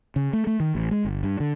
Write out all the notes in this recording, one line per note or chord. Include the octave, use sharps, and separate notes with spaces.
C#3
A3
A3
D#3
A1
G#3
G1
G2
D3